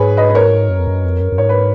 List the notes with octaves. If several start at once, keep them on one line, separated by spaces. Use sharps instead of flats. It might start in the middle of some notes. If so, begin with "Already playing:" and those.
Already playing: G#2 G#4 B4 C#5
B4 D#5
B4
A#4 C#5
F#2
F2
F#2
F2
F#2
F#2
G#2 C#5
B4